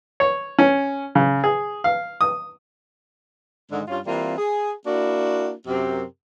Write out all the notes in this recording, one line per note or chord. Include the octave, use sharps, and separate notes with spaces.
C#5
C#4
C#3
G#4
F5
D#6
G#2 D3 D#3 G#3
G2 C#4 F4
E3 G3 A#3 C4 F4
G#4
A#3 D4 E4 F#4
F#2 C3 C4 G4 A#4